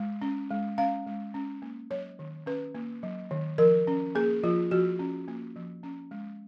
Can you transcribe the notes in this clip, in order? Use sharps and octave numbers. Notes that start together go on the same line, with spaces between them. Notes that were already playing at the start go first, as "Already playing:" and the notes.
Already playing: G#3
C#4
G#3
C#4 F5
G#3
C#4
A#3
F#3 C#5
D#3
C#4 B4
A#3
F#3
D#3
F3 A#4
C#4
A#3 G#4
F3 F4
F3 F#4
C#4
A#3
F3
C#4
G#3